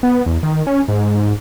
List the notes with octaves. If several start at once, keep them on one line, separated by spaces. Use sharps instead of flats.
B3
E2
D#3
C#4
G#2